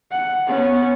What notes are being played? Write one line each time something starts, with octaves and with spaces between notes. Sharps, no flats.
F#5
B3 C#4